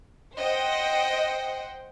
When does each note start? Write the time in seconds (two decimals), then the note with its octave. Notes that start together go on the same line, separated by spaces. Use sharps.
0.36 C5 D#5 F#5 G5